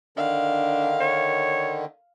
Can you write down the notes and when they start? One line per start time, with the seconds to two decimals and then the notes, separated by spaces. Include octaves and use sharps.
0.17 D3 D#3 D4 F5
1.01 C#5